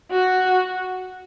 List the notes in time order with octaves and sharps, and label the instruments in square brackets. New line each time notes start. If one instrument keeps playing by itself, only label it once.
[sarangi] F#4